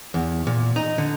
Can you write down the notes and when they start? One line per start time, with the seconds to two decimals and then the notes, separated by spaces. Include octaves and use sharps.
0.14 E2
0.47 A#2
0.76 D#4
0.98 D3